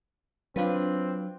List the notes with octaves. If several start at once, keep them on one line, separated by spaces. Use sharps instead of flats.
F#3 C4 D4 F4 B4